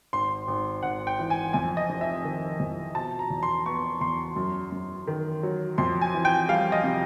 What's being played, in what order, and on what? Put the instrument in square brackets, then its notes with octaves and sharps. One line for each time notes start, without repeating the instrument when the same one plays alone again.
[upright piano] G#1 C6
G#1
G#1 F#5
G5
E3
G#5
F2 G#5
D#5
F1
E5
D#3
F2
B2 A5
A#5
E2
C6
B3 C#6
E2 C6
F#2
F#2
D#3
F#3
F2 C6
G#5
E3
G5
G3 F5
D#5
C3